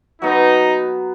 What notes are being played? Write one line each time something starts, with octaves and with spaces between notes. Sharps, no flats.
F#3 B3 D#4